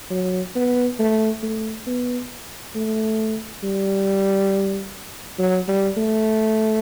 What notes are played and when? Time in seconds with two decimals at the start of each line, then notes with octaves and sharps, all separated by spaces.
0.11 F#3
0.56 B3
0.99 A3
1.43 A3
1.87 B3
2.75 A3
3.63 G3
5.39 F#3
5.68 G3
5.97 A3